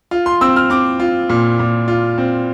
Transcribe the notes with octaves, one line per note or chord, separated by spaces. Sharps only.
F4
C6
C4 E6
F6
C4 D6
F4
A#2
A#2
F4
C4